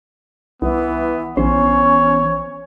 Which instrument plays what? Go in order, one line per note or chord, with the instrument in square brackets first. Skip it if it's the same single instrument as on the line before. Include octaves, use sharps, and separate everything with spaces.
[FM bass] C2 [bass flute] E3 [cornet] B3
[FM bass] A#1 [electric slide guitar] E3 B3 C5 [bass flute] C#4 [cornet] C#5